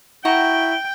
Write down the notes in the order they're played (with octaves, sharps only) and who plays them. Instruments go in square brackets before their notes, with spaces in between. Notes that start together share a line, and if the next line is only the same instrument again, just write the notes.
[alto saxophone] E4 [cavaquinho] F#4 A#5 C#6 [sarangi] G5